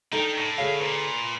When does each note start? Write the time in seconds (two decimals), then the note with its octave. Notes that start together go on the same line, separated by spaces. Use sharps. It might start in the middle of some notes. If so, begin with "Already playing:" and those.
0.12 D#3 D4 D#4 A4 G5
0.38 A2
0.58 D3 G#4 C#5 F5
0.81 A#2 B4